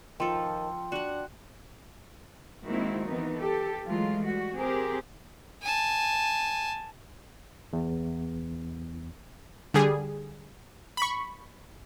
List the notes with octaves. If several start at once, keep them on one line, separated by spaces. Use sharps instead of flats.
D#3 F3 A4 G5 C6
D4 F#4 F#5
D#3 G#3 A#3 C4 E4 F#4
D#3 E3 B3 D#4
G4 A4
E3 F#3 G#3 A3 F4
G3 F#4
C4 G4 G#4 A#4 C5
G#5 A5
E2
D3 G3 G#4
B5 C#6